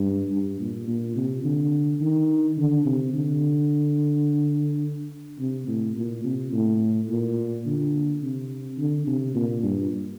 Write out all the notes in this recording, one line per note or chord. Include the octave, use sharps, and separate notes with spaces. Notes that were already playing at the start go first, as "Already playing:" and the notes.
Already playing: G2
G2
A#2
A#2
C3
D3
D#3
D3
C3
D3
C3
A2
A#2
C3
A2
A#2
D3
C3
D3
C3
A#2
G2